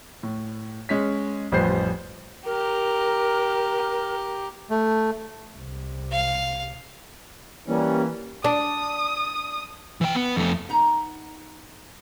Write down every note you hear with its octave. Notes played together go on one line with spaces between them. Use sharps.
A2
G#3 C#4 B6
A1 F2 G3 B4 C5 C7
G4 A#4 A#5
A3
C2 C3
F5
E3 G3 A#3 C#4
D4 D5 D#6
E3 G5
B3
F2 A3
B3 D#4 A#5